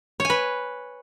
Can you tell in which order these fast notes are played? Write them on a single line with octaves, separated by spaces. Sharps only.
C#5 G#5 B4